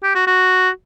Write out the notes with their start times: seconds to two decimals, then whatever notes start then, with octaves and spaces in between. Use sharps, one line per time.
0.03 G4
0.15 F#4
0.27 F#4